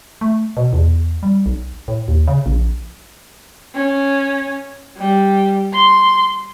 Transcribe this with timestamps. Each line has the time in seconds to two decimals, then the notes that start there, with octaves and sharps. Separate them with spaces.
0.21 A3
0.57 B2
0.73 E2
1.23 G3
1.46 B1
1.88 A2
2.08 D#2
2.28 C#3
2.46 A#1
3.75 C#4
4.97 G3
5.73 C6